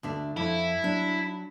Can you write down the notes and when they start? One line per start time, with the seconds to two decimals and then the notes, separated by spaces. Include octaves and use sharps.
0.03 D2 D4 E5
0.37 F2 E4
0.82 F#3 D4